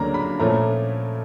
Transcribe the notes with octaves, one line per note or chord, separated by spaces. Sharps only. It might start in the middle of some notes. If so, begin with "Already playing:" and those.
Already playing: D2 C#3 F#3 A#3 D4 A#5
B5
A#2 F3 A3 C#4 E4 A#5